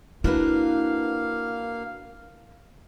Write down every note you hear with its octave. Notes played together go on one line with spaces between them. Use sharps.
A#3 D4 E4 F#4 B4 F5